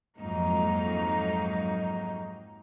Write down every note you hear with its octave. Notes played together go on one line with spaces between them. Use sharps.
F2 G#2 F#3 A#3 D#4